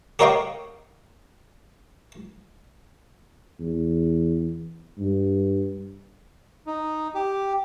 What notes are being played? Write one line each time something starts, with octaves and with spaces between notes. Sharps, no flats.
G4 A#4 C#5 D#5 F5 G5
E2
G2
D#4
G4